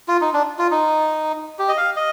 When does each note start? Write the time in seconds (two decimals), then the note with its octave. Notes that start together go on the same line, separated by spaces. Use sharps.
0.08 F4
0.21 D#4
0.34 D4
0.59 F4
0.71 D#4
1.59 G4
1.68 D#5
1.77 F5
1.96 D#5